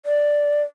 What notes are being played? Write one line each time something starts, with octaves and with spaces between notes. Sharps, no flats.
D5